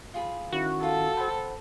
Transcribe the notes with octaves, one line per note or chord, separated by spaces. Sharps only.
F4 G#4 B5
D#3 C#4 E4 F#4
F4 A4
C5 F#5 G5 B5 C6